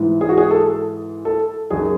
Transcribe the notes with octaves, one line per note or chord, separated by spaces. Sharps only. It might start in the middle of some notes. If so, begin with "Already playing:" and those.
Already playing: G#2 E3
G#4
F#4
G#4
A4
A4
F#2 D#3 G#4